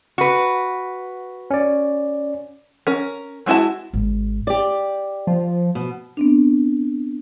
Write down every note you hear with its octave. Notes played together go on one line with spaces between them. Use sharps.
F#4 B4
C#4 D5
C#4 A#4
F#3 G#3 E4 F#4 A5
G#1
G4 D5
F3
B2
B3 C4 D4